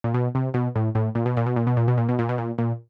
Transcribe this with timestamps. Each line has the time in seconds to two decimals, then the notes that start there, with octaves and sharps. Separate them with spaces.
0.04 A#2
0.14 B2
0.35 C3
0.54 B2
0.76 A2
0.95 A2
1.15 A#2
1.26 B2
1.37 A#2
1.46 B2
1.56 A#2
1.67 B2
1.77 A#2
1.88 B2
1.98 A#2
2.09 B2
2.19 A#2
2.29 B2
2.38 A#2
2.58 A#2